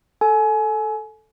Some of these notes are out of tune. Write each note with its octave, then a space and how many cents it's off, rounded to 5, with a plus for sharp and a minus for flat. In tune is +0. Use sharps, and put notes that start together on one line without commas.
A4 +0 G#5 +30